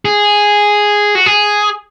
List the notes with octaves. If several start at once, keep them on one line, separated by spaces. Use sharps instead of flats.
G#4
F#4
G#4